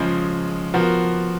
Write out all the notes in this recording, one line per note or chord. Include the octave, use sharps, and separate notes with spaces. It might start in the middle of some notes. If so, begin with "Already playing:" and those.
Already playing: C#3 F3 G#3
F3 B3 F#4 A#4